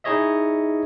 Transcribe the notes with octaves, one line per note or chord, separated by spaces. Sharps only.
D#4 E4 G#4 C#5 D#5 E5